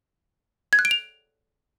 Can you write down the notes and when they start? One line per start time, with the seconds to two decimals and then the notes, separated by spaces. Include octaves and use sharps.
0.73 G#6
0.79 F#6
0.85 D7
0.91 F7